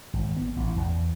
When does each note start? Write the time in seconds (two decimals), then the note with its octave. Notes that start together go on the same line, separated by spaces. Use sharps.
0.13 G#1
0.36 B3
0.56 A1
0.76 E2